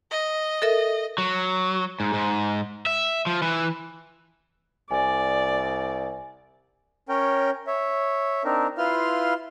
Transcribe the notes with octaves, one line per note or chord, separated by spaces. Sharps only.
D#5
A4 A#4 E5
F#3
G#2
G#2
E5
F3
E3
C2 D5 G#5
C#4 A#4 C#5 G5
C#5 E5
C4 D4 D#4 A#4
E4 F4 B4 F5 C6 F6